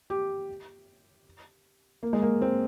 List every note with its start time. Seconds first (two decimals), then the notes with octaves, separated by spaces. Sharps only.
0.10 G4
2.03 A#3
2.13 G#3
2.22 A#3
2.42 C4